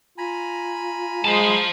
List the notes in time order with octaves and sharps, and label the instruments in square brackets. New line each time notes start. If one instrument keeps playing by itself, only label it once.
[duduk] F4 [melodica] G#5 A#5 B5
[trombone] G#3 [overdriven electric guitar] C5 A5